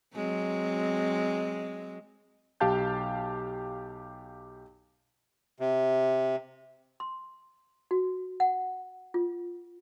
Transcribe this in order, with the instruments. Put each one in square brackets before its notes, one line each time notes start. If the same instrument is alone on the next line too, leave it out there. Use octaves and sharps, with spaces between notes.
[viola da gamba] F#3 G#3 C4
[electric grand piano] B1 G4 F5 A5 G6
[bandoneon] C3
[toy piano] C6
F#4
F#5
F4